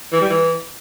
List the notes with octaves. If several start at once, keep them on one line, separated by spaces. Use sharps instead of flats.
E3
G3
E3